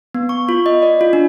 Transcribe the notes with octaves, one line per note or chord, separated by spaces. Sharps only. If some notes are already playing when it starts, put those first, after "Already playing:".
B3
C#6
F4
D#5
D5
F4
D4